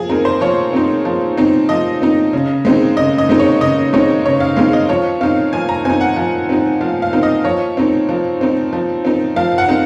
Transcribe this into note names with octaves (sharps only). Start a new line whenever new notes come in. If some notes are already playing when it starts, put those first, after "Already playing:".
Already playing: F3 G#4
C4 D#4 A#4
C5
F3 C#5
C4 D#4
F3
C4 D#4
F3 D#5
C4 D#4
C#3
G#3 C4 D#4
C#3 D#5
D#5
G#3 C4 D#4
C#5
C#3 D#5
G#3 C4 D#4 C#5
C#3 C#5
F5
G#3 C4 D#4 F5
D#5
F3 C#5
C4 D#4 F5
F3 G#5
A#5
C4 D#4 G#5
F#5
F3
C4 D#4
F3 F5
F5
C4 D#4
D#5
F3 C#5
C4 D#4
F3
C4 D#4
F3
C4 D#4
F3 F5
F#5
C4 D#4